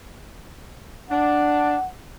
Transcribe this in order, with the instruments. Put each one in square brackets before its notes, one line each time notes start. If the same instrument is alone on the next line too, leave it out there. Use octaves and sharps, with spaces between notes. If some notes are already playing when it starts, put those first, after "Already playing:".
[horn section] D4 [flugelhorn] F#5